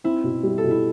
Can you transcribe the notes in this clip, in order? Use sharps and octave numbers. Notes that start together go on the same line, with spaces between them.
C4 E4
B2
G3
A4
B2
E4